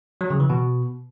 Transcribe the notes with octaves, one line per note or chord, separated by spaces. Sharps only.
F#3
C#3
E3
B2